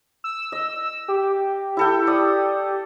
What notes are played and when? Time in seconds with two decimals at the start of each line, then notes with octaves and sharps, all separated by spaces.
0.24 E6
0.52 D#5
1.08 G4
1.77 E4 A4 G5
2.07 D5 D#6